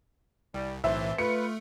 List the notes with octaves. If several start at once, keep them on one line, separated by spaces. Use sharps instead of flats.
C2 G3
B1 A2 E3 C4 A4 C5 E5
A3 F4 B4 C#7